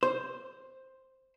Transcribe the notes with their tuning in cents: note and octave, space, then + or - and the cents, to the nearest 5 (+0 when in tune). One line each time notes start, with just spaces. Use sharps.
C5 +5